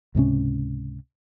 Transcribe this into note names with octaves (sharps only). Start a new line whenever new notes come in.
C#2 G#2 C3 C#4